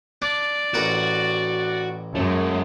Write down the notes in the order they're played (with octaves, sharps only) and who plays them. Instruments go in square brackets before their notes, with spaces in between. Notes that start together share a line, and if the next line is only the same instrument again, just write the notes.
[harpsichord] D4 [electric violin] D5
[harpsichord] A1 A#4 F#5 [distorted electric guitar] F#4
[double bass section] F#2 [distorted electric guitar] G#3 A3